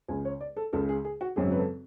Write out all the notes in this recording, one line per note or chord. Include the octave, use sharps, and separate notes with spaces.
C#2 C#3 G#3 G#5
C#5
D5
A4
C#2 C#3 G#3 A4
G#4
G#4
F#4
G#1 F#2 C#3 F#3 G#4
B4
A4